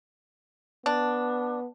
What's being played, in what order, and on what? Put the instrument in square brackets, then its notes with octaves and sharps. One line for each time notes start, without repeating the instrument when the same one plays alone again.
[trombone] B3 [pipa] D4